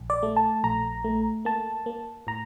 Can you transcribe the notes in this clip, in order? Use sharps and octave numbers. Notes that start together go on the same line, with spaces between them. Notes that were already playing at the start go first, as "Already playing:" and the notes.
Already playing: A#1
D5
A3
A5
A#1 A#5
A3
A#3 A5
A#3
A2 A#5